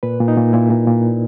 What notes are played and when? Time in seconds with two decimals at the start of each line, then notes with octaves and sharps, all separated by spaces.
0.03 A#2 B4
0.20 A#2
0.28 D#4
0.37 A#2
0.53 A#2 E4
0.70 A#2
0.87 A#2